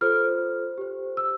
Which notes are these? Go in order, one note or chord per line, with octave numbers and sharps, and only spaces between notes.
F4 A4 C5 F6
G4 C5
E6